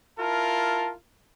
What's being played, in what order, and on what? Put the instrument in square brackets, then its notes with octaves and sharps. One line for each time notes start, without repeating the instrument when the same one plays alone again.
[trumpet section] E4 F4 A#4 [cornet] A5